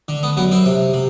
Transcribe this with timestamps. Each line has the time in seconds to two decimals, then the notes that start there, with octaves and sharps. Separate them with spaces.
0.08 D3
0.23 B3
0.37 F#2 B3
0.51 C4
0.66 C3
0.94 C3